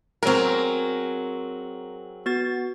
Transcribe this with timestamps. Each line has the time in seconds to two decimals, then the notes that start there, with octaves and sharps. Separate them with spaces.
0.23 F#3 C4 G#4 A#4 A#5
2.26 B3 F#4 A6